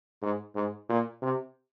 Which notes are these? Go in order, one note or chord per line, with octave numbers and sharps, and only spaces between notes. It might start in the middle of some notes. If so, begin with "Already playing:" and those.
G#2
G#2
A#2
C3